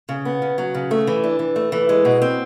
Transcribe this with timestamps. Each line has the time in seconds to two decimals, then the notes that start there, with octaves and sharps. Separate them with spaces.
0.09 C#3
0.25 B3
0.42 C#3
0.58 F#3
0.74 C#3
0.91 A3
1.07 E3
1.24 D4
1.39 E3
1.56 A3
1.72 E3
1.89 G#3
2.05 B2
2.22 C4